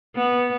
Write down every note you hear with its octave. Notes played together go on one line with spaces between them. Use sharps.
B3